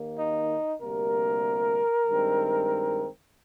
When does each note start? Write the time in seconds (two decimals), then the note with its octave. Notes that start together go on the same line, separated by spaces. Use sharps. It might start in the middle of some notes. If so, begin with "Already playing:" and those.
Already playing: D#2 D#3 A#3
0.19 D#4
0.81 D2 C3 G3 A#3 A#4
2.07 G2 D#3 G#3 C4